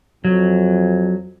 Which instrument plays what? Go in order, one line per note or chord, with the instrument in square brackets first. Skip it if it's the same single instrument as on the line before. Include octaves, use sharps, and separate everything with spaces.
[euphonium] F2 [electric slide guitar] F#3